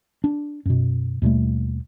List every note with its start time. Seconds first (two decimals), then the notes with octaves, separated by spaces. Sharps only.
0.24 D4
0.65 F#2 B2
1.22 D#2 B2 G3 A3